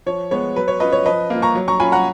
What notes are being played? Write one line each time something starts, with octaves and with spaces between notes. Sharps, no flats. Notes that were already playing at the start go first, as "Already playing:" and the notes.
F3 C#5
G#3 B3 C#5
F#3 B4
C#5
C#4 F4 B4 D#5
C#5
F3 B4 D#5
A#3 F4
A#5 C#6
F#3
A#5 C#6
C#4 F4 G#5 B5
F#5 A#5